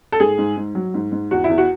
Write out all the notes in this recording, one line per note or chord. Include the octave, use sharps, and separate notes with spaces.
A4
G#2 G#4
G#2
G#2
F#3
G#2
G#2
E2 F#4
E4
E2
F#4